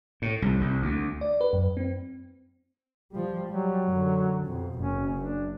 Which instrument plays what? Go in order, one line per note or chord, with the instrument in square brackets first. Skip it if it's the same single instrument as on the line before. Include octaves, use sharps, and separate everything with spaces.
[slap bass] A2
C2
C2
D2
[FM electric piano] D5
B4
F#2
C4
[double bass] F3 G3
[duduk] F#3 [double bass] G3
[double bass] F#2 D3
F2 B2
[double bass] F#1 F#2 [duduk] C#4
[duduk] D4